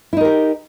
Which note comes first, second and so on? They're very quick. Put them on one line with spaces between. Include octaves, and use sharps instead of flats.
E4 D#4 A#4 G4